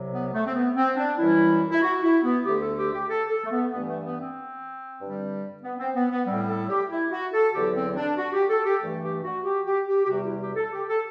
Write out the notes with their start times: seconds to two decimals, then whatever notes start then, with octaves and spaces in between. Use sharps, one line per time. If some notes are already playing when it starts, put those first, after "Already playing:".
Already playing: C2 C3 F#3
0.12 B3
0.33 A3
0.46 C4
0.54 B3
0.75 C4
0.96 D4
1.17 F#2 E3 G3 E4
1.70 E4
1.81 F#4
2.02 E4
2.23 B3
2.44 D2 D3 A3 G4
2.60 A4
2.76 G4
2.92 G4
3.08 A4
3.29 A4
3.44 A3
3.50 B3
3.71 G2 E3 A3 B3
3.88 A3
4.04 B3
4.19 C4
4.98 G2 D3 G3
5.62 B3
5.78 C4
5.94 B3
6.11 B3
6.26 A2 G3 C4
6.47 A4
6.69 G4
6.89 E4
7.11 F#4
7.32 A4
7.53 E2 D3 F#3 G4
7.75 C4
7.95 D4
8.17 F#4
8.33 G4
8.49 A4
8.65 G4
8.80 G2 E3 A3
9.02 G4
9.23 F#4
9.44 G4
9.65 G4
9.87 G4
10.04 G4
10.07 E2 C3 G3 F#4
10.24 E4
10.39 G4
10.55 A4
10.71 G4
10.88 A4